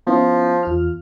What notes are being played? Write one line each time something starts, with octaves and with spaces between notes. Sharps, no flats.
F3 B3 C#4 E4
E2 F4 F6